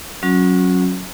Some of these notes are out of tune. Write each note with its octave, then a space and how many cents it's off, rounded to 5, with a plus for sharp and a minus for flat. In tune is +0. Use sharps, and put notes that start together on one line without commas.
F#3 +0 C#4 -15 F#4 -30